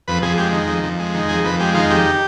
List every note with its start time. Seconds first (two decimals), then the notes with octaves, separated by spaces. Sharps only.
0.08 F2 B4
0.23 F2 G#4
0.38 G#3 G4
0.53 D#3
0.68 F2
0.83 F2
0.99 G#3
1.15 D#3
1.29 F2 G#4
1.44 F2 B4
1.60 G#3 G4
1.75 D#3 F4
1.90 F2 G4